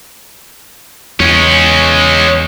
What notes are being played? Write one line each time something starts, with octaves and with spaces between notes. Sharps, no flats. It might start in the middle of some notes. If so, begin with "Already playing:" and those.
E2 G#3 C#4